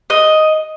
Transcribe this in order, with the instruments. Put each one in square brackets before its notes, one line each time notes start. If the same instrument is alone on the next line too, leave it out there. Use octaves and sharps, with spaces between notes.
[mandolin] D#5